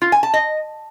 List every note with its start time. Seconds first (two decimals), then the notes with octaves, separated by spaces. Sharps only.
0.02 F4
0.12 G#5
0.23 A5
0.34 D#5